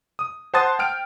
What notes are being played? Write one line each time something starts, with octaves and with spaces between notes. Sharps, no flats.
D#6
C5 F#5 A5 C6 D#6 A6
G5 F6 D7